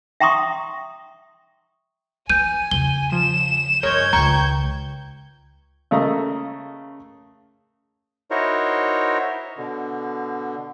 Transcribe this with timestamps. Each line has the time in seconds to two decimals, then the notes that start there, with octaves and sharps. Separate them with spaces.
0.20 E5 G5 A#5 C6 C#6 D#6
2.30 E3 G#5 G6 D#7
2.71 E2 C#3 G7
3.12 F3 E7
3.83 G2 G#3 A#4 C#5 G6 G#6
4.13 C#2 D#3 G5 A#5 C#6
5.91 C#3 A3 A#3 D#5 A#5 D#6
8.31 D#4 E4 F#4 A#4 C5 C#5
9.58 B2 D3